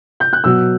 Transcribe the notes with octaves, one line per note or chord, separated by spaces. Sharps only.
G6
F#6
B2 F#3 E6